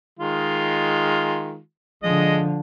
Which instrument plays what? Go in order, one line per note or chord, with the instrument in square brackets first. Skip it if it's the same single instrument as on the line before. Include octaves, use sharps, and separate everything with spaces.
[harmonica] D#3 G#3 F4
[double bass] D3 F3 [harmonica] G#3 D#5